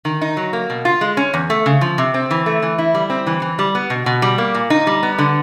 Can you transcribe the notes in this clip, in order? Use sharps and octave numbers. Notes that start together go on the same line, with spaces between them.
D#3
D#4
F#3
A#3
B2
F4
G#3
C#4
E2
A3
C#3
F3
C3
C4
E3
A3
E3
E4
G3
C4
E3
E3
G3
B3
B2
B2
G3
A#3
A#2
D#4
G3
B3
D3